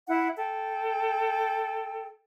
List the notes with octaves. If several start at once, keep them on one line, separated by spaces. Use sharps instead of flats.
E4 F#5
A4 G5